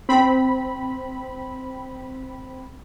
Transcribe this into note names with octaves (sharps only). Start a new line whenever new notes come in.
C4 B5